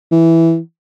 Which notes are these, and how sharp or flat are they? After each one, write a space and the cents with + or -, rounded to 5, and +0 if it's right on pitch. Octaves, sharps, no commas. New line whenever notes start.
E3 +0